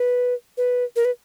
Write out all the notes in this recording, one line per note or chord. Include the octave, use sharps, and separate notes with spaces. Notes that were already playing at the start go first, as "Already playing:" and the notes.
Already playing: B4
B4
A#4
B4